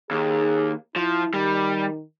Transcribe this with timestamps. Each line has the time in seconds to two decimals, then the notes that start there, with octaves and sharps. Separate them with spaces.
0.11 D#2 G#4
0.96 F3 E4
1.34 D#3 G3